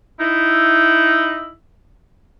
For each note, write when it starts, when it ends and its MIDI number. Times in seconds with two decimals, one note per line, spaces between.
0.20 1.52 63
0.20 1.52 64